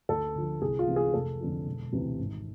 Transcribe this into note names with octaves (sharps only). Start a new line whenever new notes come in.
D2 A4
D3 F3
C2 G#4
F4
C3 E3
G#4
F1 A4
F2 D3 F3
E1
D2 C3 E3
G#1